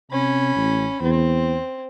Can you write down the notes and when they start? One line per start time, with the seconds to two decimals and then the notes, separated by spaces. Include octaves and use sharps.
0.11 C3 C#4 B5
0.56 A1
1.01 E2 C4